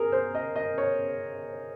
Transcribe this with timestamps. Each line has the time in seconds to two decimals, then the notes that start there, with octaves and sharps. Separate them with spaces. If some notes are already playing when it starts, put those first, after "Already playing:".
Already playing: G#4 A#4
0.12 C5
0.35 D#5
0.56 D#5
0.78 C#5